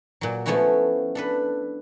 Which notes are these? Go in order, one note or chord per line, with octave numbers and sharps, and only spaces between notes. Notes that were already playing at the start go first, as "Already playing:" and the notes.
A#2 F#3
F3 A3 B3 C#4 E4 F#4
D4 A4 B4